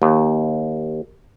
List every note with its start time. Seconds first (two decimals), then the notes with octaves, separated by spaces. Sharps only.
0.02 D#2